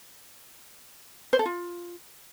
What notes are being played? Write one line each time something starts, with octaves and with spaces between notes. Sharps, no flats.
C5
A4
F4